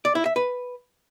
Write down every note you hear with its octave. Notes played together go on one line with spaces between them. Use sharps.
D5
E4
E5
B4